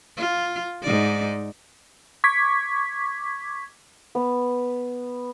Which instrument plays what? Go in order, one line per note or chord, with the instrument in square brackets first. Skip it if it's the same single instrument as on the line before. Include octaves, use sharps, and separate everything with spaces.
[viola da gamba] F4
G#2 D#4 D5
[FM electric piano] C#6 D6 G#6 B6
[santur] B3